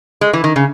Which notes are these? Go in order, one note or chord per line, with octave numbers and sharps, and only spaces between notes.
G#3
E3
D#3
C#3